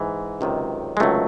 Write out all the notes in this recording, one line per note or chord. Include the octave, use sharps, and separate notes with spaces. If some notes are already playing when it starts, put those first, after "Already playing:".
Already playing: G#2 E3
C#2 C3 D#3 F#3
G#3
C#2 C3 D#3 F#3 A3